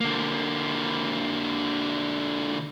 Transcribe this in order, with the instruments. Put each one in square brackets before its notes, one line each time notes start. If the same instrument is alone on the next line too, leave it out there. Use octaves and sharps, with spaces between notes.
[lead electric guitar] D3 A#3